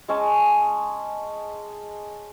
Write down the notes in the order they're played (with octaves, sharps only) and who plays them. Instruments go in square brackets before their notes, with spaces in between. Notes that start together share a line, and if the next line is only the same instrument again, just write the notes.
[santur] G#3 C#4 D#5 A5